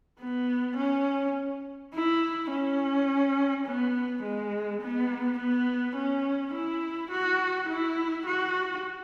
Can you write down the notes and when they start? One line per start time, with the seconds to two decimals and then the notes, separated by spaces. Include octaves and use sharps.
0.20 B3
0.77 C#4
1.93 E4
2.51 C#4
3.65 B3
4.23 G#3
4.81 B3
5.38 B3
5.96 C#4
6.54 E4
7.11 F#4
7.69 E4
8.26 F#4